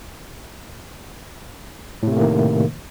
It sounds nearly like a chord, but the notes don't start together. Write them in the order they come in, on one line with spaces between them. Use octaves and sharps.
A2 C3 A3 A#3 D#3